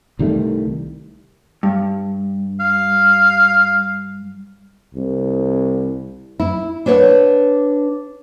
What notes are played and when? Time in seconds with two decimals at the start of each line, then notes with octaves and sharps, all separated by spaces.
0.19 C2 D#3 G3 A3
1.63 G2
2.60 F5
4.94 C2
6.40 E4
6.86 D4 B4 C#5 F#5